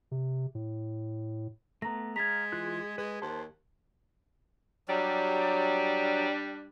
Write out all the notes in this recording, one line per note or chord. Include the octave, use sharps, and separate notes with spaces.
C3
A2
A3 B3 A#5 A#6
G#3 F5 A#5 G#6 A6 B6
E3 F4 F#6
G#3 B4
D#2 C5 A5 C6
F#3 G3 D4